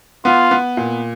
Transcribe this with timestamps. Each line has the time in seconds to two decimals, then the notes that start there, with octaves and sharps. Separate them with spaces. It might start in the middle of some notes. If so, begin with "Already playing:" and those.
0.25 B3 F4
0.51 B3
0.77 A#2